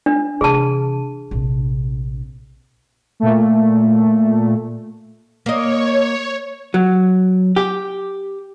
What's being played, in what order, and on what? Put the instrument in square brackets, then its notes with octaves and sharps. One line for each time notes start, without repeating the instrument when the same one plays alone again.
[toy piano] D4
[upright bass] C3 E3 [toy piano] G#4 A5
[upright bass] A#1 C3
[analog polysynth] A#2 A3
[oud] A#3 D#5 [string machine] C#5
[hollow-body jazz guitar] F#3
G4